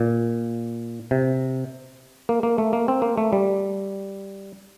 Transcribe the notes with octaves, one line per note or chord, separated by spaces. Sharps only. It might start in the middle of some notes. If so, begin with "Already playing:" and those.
Already playing: A#2
C3
A#3
A#3
A3
A#3
C4
A#3
A3
G3